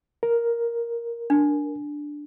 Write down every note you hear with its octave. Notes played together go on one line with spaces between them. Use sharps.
A#4
D4